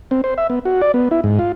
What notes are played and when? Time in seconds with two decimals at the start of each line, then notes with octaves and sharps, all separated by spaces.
0.11 C4
0.24 C5
0.38 E5
0.50 B3
0.65 F#4
0.82 D5
0.94 B3
1.11 E4
1.24 G#2
1.39 F4